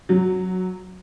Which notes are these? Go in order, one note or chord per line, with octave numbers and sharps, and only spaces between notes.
F#3